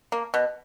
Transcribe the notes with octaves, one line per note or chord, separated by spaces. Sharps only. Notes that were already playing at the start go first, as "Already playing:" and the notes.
A#3
B2